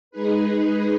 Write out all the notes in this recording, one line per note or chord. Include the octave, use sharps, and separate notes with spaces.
G#3 D#4 G#4 B4